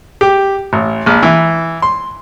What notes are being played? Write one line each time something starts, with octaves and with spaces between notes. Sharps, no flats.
G4
A1
A#1
E3
C6